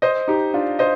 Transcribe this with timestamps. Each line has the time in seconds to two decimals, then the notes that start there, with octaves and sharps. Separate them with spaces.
0.02 C5 D#5
0.28 D#4 G4
0.54 D4 F4
0.79 C5 D#5